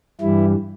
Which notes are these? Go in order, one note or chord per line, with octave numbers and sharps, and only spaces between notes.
G2 E3 G3 E4